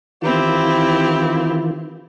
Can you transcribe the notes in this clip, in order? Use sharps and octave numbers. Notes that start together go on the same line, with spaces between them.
D#3 E3 C4 E4 F4 G4